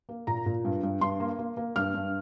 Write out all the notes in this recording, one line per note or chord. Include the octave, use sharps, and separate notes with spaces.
A#3
A#2 A#5
A#2
G2
G2
G2 C6
A#3
A#3
A#3
G2 F6
G2